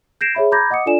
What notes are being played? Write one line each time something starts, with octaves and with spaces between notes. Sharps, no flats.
G6 G#6 A#6 C7 D7 E7
G#4 C#5 E5 B5
A#5 B5 D6 G6 G#6 A#6
D#5 F#5 D6 D#6 C#7
D4 F4 A4 D5 G#5 E7